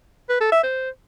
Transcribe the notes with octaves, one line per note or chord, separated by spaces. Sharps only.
B4
A4
E5
C5